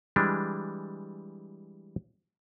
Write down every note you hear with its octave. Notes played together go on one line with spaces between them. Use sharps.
E3 G3 G#3 D4